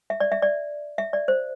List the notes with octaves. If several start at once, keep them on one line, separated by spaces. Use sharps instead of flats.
E5
D5
E5
D5
E5
D5
C5